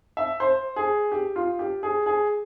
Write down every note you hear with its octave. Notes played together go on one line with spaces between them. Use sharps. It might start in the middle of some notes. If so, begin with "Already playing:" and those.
E5
C5
G#4
G4
F4
G4
G#4
G#4